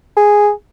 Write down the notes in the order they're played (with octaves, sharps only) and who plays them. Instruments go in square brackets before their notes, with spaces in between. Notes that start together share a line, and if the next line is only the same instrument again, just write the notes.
[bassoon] G#4